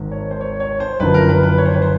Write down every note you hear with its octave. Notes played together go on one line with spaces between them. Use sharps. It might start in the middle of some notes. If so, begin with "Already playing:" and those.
Already playing: G#1 G#2 D#3
C#5
C5
C#5
C#5
C5
F#1 F#2 D3 F3 B4
A#4
B4
B4
C#5
C5
B4
C5